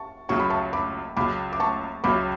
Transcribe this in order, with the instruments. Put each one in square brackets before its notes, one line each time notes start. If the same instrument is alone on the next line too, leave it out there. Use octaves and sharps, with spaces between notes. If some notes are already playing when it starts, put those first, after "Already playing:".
Already playing: [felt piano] A5 C#6
[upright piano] C#2 C#3 F#3 [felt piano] C#6
[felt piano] B5
A5 C#6
B5 D6
[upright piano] C#2 C#3 F#3 [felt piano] B5 D6
[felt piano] D6
A5 C#6
[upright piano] C#2 C#3 F#3 [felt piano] B5 D6